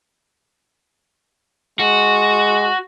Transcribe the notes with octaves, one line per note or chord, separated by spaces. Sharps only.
G#3 F#4